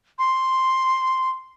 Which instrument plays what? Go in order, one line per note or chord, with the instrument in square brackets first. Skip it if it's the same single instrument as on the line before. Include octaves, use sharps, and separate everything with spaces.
[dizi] C6